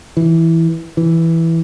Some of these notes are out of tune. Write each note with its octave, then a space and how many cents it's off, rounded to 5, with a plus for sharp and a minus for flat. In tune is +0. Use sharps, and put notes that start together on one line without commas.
E3 -5
E3 +0